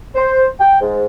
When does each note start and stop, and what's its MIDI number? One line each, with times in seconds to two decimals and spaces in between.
0.15 0.43 72
0.59 0.78 79
0.80 1.05 44